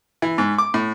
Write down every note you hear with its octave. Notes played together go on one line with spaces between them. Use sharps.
E3
G#2
D6
A2